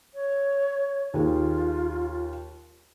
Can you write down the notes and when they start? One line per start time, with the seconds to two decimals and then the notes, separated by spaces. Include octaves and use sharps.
0.15 C#5
1.14 D#2 F4 G#4